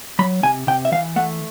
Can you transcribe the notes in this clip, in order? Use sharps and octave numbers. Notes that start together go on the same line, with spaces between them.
F#3 B5
C3 G#5
C3 G5
E5
E3 F5
A3 F#5